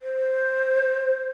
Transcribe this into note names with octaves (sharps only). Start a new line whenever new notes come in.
C5